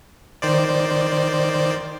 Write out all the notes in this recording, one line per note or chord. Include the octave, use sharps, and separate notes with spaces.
D#3 C5 D5